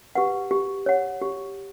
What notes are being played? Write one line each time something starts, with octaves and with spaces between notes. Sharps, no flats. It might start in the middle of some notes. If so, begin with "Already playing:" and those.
G4 B4 F#5
G4
C#5 F#5
G4